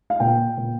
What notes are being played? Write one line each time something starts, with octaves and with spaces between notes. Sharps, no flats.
F5
A#2 G5
A#2